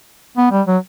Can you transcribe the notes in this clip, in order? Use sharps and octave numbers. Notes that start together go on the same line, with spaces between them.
B3
G3
F#3